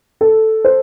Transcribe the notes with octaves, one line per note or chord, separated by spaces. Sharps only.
A4
C5